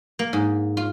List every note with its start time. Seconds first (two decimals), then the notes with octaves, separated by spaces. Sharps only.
0.19 A#3
0.33 G#2
0.77 F4